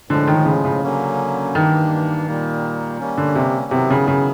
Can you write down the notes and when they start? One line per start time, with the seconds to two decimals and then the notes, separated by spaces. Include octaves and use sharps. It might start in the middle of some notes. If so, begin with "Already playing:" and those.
0.10 A2 D3 F3 G#3
0.27 D#3
0.45 C#3
0.65 C#3
0.83 D3 F#3 A#3 C#4
1.54 G2 D#3 E3 G3 A#3 D4
2.27 A#2 G3 A#3
2.99 G3 A#3 C#4
3.17 D3
3.35 C3
3.71 C3 D#3 F#3 B3 E4
3.90 C#3
4.08 C#3